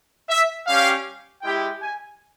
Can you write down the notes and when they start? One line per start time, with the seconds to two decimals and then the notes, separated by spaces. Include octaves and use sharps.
0.29 E5
0.66 G3 C#4 G4 F5
1.42 G#3 E4 G4 G5
1.81 G#5